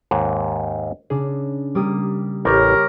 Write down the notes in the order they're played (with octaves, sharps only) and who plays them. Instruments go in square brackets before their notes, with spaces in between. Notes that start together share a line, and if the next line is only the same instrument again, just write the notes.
[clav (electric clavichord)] D#2 G#2
[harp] C#3 D4 [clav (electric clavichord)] G#4
[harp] G3 A#3 D#6
[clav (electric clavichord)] A1 G3 [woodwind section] G4 A#4 [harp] C#5